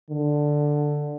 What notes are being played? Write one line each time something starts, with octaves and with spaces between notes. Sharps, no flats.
D3